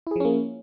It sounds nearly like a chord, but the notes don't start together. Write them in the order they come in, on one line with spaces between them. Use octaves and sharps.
E4 G#4 F3 C#4 A#3